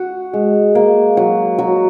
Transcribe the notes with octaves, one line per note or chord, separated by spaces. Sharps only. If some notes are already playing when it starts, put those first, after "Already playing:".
Already playing: F#4
G#3
A#3
F#3
F#3